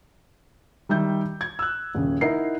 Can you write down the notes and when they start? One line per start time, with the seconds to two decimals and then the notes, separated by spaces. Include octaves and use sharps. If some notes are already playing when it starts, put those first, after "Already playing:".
0.89 D#3 G3 E5 G6
1.41 G#6
1.59 E6 F#6
1.95 D#1 C#3
2.21 D#4 E4 A#4 F#5 C7